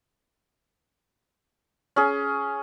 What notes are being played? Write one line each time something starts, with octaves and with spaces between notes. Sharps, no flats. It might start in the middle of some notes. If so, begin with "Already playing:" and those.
C#4 G#4